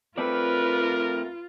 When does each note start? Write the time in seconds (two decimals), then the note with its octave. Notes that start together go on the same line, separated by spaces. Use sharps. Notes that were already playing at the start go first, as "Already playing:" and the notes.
0.18 A3 C4 F4 A#4 B4 D5